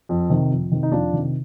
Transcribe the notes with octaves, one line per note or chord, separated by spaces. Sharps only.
F2
C3 D#3
F2
C3 D#3
D#4
F2 D4 F4
C3 D#3